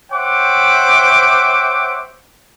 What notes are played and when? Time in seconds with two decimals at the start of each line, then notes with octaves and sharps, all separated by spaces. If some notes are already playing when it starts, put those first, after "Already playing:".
0.12 C5 C#5 E5 F#5 G5 D6